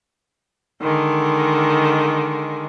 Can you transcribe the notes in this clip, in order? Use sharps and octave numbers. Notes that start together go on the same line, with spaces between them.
D3 D#3 G#3